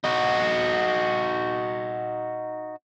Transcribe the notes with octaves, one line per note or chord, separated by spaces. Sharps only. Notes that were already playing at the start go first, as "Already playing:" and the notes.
D#4 F#4